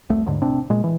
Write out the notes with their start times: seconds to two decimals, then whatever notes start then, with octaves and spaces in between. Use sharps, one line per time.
0.09 E1 C2 A3
0.26 D#2 G#2 D3
0.42 A#1 C3 C4 D4
0.70 A#2 G#3
0.84 E3